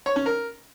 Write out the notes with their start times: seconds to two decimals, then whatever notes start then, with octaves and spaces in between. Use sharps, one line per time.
0.06 C#5
0.16 C#4
0.26 A#4